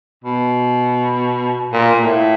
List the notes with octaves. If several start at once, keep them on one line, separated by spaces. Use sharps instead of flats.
B2
A#2
A#2
A2